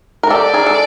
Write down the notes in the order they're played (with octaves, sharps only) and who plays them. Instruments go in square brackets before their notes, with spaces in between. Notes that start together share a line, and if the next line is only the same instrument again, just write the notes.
[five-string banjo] A#4
[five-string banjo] G4 A4 [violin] D5
[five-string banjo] G#4 A#4
A4